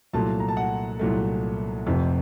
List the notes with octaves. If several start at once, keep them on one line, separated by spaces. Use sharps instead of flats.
C2 A#2 F#3 A3 A5
A#5
A5
F#5
C2 A#2 F#3 A3
F1 F2 C3